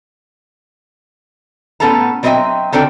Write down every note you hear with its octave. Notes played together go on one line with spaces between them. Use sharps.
A2 B3 C#4 A4 A5 A#5
F#3 C4 B4 D#5 E5 G5
D3 D#3 C4 D4 A4 G5